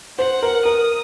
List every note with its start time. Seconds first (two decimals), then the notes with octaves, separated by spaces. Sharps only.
0.18 C5 F#5
0.42 A#4
0.65 A#4 D#6